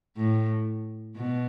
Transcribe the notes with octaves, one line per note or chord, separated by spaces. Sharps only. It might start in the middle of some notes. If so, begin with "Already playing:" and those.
A2
B2